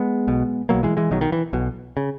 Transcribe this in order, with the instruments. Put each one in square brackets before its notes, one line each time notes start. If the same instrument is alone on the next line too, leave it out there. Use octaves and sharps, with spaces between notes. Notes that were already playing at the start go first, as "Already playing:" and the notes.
Already playing: [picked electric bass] G#3 B3
B1 B2
B1 B2 F#3 A#3
E3 G#3
E3 G#3
B1 B2 D#3 F#3
D#3
E3
B1 B2
C#3